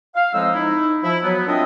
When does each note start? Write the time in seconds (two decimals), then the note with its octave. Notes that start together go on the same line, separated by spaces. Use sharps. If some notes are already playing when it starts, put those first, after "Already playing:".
0.15 F5
0.33 A2 F3 G#3 C4 D#4 E6
0.54 D#4 E4
1.03 F3 E4
1.24 F#3 B3
1.47 A#2 C4 D4 F4 D#5 E5